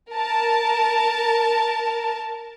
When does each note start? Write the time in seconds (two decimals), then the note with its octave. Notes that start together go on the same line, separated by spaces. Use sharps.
0.12 A#4 A5